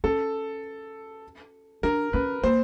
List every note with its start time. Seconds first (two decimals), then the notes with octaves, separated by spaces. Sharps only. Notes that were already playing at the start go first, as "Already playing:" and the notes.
0.04 C#4 A4
1.83 D4 A#4
2.13 C#4 B4
2.43 A#3 C5